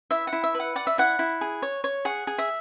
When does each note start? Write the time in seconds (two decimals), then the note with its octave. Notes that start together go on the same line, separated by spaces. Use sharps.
0.11 E4 E5
0.27 F#5
0.33 E4
0.44 E5
0.55 B4 F#5
0.76 D5 F#5
0.87 E5
0.98 E4 F#5
1.19 E4
1.41 G#4
1.62 C#5
1.84 C#5
2.05 G#4 F#5
2.27 G#4
2.38 E5